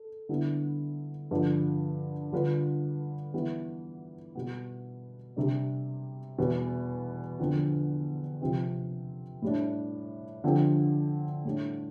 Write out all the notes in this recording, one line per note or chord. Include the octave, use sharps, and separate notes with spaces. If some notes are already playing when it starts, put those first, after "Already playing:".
Already playing: A4
D3 G3 B3 E4
G2 D3 F3
D3 G3 D4 F4 B4
E3 G3 B3
B2 G3 B3
C3 G3 D4
E2 B2 G3
E2 D3 F3 C4
C3 F3 C4 G4
A2 G3 D4
D3 F3 C4 G4
A2 G3 D4